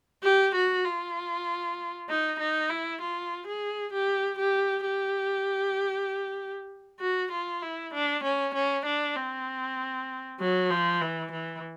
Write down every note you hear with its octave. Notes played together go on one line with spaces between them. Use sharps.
G4
F#4
F4
D#4
D#4
E4
F4
G#4
G4
G4
G4
F#4
F4
E4
D4
C#4
C#4
D4
C4
F#3
F3
E3
E3